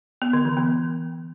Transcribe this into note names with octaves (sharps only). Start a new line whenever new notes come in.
B3
D3
E3
B3